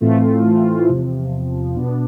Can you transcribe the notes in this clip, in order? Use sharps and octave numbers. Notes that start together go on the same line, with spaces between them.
A2 E3 A3 C4 F4
E2 C3 F3
B2 B3 D4